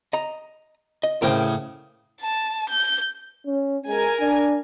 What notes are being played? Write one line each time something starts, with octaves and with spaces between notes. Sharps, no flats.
D#5 A#5
D#5
A2 C#3 A#4 C5 G5
A5
G6
C#4
G#3 A#4 G#5
D4